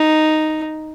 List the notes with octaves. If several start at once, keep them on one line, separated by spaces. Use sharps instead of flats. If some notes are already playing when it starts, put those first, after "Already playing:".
Already playing: D#4